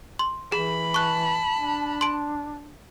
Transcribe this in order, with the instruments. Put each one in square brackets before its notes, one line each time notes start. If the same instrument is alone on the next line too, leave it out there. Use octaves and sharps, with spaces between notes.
[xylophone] C6
[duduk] E3 [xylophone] G#4 [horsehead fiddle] B5
[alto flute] A5 [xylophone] C#6 F#6
[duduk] D4
[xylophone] C6 D7